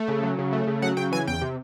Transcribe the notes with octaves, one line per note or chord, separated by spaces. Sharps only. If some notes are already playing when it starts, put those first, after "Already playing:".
Already playing: A3
C#3
F#3
C#3
A3
C#3
F#3 F#5
C#3 G5
E3 G#5
E2 G5
C3